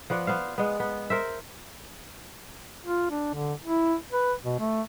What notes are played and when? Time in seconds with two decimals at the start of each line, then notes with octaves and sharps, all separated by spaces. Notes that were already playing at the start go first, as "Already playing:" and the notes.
0.10 F3 B3 D5 F#5
0.27 B3 C5 F5
0.58 G#3 B3
0.80 B3
1.10 A#4 C5 E5
2.85 F4
3.11 D4
3.34 D3
3.64 E4
4.12 B4
4.44 B2
4.59 A3